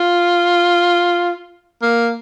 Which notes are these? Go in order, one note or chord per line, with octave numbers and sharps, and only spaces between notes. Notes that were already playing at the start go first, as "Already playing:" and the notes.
Already playing: F4
A#3